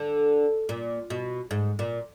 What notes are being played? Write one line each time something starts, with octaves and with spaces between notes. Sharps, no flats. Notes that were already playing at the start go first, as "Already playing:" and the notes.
Already playing: D3
A#2
B2
G#2
A#2